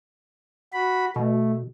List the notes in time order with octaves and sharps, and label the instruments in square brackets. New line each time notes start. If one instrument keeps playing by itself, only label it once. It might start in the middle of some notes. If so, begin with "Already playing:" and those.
[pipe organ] F#4 B5
[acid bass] B2 [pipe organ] A3